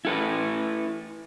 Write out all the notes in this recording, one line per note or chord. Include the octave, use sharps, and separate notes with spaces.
E4 A4 B4